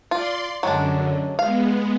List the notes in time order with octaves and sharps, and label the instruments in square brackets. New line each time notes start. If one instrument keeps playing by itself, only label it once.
[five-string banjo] F4 [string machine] D5 C6
[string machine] F#2 D3 [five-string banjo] F#3 G#3 D4
[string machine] G#3 B3 [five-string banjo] F5